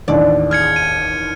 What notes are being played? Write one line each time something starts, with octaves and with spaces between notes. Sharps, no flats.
A1 D#2 D4 D5
G#4 F6 G#6 C#7
D#7